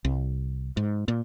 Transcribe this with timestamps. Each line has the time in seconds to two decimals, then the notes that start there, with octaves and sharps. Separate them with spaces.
0.05 C2
0.77 G#2
1.08 A#2